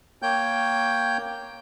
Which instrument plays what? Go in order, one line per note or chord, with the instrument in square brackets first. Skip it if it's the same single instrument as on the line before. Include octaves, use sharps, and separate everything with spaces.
[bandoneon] A#3 C#5 G5 G6